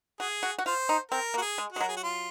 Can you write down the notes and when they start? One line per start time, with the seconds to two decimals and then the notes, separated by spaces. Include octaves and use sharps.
0.20 F#4 G#4
0.43 F#4
0.58 F#4
0.66 F4 C5
0.89 D#4
1.11 C4 A#4
1.34 A#3
1.38 F#4
1.42 G#4
1.58 G#3
1.73 G#3 F#4
1.80 F#3 A#4
1.89 G#4
1.97 F#4
2.04 F4